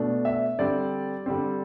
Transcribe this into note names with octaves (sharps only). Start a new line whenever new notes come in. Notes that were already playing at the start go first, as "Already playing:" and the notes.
Already playing: B2 A3 D4
E5
D3 G3 C4 D5
D3 G3 C4